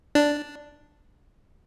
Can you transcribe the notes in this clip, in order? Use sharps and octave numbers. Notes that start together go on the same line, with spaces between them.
D4